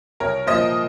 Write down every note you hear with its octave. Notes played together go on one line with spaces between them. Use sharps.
C2 A#4 C#5
A#2 F3 C5 D#5